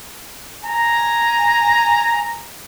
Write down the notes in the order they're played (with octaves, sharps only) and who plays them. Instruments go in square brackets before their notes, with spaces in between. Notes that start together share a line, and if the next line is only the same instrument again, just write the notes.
[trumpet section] G#5 A#5